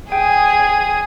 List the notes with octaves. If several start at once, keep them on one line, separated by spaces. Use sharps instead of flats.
G#4 G5 D#6